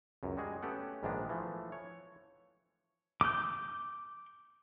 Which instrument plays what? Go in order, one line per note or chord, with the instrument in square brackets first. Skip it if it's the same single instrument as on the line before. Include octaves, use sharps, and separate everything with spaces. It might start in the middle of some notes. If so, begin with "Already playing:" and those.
[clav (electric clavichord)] C#2 F#2
G3 G#3 F#4 G#4
A3 B3 C#4 G4 A4 F#5
A#1 G#2 D#3 G#3 B3 D4
E3 F3 A3
C#5
[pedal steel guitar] D6 G6